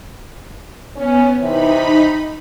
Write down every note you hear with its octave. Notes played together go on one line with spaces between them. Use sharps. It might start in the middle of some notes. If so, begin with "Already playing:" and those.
B3 C#4
C3 E3 D#4 B5